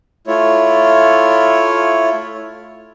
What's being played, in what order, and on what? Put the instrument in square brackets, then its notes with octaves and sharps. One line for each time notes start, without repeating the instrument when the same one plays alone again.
[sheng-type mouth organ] A3 E4 F4 C#5